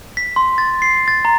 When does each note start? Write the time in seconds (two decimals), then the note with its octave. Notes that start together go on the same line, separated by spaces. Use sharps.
0.17 B6
0.36 C6
0.58 A6
0.82 C7
1.08 A6
1.25 A#5